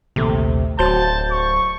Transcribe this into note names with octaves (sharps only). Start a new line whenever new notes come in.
A#1 D#2 C3 A3
D1 F#3 C5 A5 G6
C#6